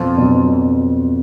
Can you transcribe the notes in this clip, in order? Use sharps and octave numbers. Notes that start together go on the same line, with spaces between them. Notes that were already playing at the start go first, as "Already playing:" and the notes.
Already playing: F2 B2 F#3
B2 F#3 D4